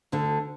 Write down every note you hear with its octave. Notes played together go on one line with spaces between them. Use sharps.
D2 D3